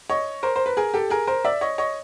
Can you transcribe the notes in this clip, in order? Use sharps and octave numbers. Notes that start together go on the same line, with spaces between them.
C#5 D#5
A#4 C5
C5
B4
G#4 A#4
G4 A4
G#4 A#4
A#4 C5
D5 E5
C#5 D#5
C#5 D#5